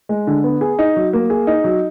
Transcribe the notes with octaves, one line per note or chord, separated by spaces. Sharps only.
G#3
D3
B3
G#4
D#4
F#3
A#3
G#4
D#4
F#3